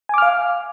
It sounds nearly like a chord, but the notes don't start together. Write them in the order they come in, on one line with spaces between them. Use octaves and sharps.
G#5 D6 F6 F5